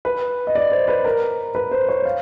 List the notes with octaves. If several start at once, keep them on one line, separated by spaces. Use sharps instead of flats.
B4
D#5
D5
C5
B4
A#4
B4
C5
C#5
F5